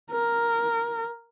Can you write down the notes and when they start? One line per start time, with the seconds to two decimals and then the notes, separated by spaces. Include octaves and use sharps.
0.11 A#4